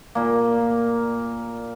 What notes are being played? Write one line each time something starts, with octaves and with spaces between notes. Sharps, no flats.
A#2 A#3